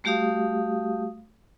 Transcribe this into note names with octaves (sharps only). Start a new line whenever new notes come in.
G3 A3 F#4 G4 F5 D#6